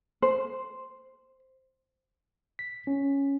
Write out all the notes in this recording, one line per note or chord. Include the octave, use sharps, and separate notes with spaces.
C5
B6
C#4